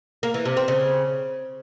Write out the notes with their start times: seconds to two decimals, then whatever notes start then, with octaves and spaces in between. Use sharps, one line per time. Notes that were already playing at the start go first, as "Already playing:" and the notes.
0.23 A#3
0.34 E3
0.45 C3
0.57 C4
0.68 C#3